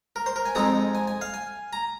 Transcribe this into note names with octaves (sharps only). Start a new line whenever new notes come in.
A#4
C5
A#4
G#5
F2 F3 G#3 C4 D#4 A#5
G#5
G#5
F5
G#5
A#5